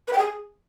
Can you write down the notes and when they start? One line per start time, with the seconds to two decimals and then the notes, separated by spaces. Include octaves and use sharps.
0.08 B4
0.13 G5
0.18 G#4